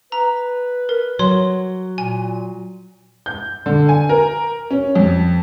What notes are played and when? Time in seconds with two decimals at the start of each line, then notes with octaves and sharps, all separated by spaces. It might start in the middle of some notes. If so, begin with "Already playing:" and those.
0.12 B4 A#5
0.89 A#4
1.19 F#3 C#5 C6
1.98 A#2 G#5
3.26 G6
3.66 D3
3.89 G#5
4.09 A#4
4.71 C#4
4.95 F2